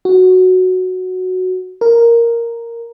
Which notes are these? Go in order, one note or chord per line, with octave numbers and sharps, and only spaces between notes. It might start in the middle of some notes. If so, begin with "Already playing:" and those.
F#4
A#4